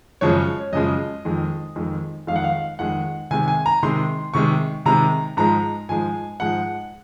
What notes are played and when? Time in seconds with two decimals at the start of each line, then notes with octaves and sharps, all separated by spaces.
0.21 F#2 C#3 F3 G#3 C#5
0.73 F#2 C#3 F3 G#3 D#5
1.25 F2 D#3 G#3
1.76 F2 D#3 G#3
2.27 F2 D#3 G#3 F5
2.36 F#5
2.44 F5
2.79 F2 D#3 G#3 F#5
3.31 C3 D#3 G#3 G#5
3.48 G#5
3.66 A#5
3.83 C3 D#3 G#3 C6
4.34 C3 D#3 G#3 C#6
4.86 C3 D#3 G#3 A#5
5.37 G#2 F3 G#3 A#5
5.89 G#2 F3 G#3 G#5
6.40 G#2 F3 G#3 F#5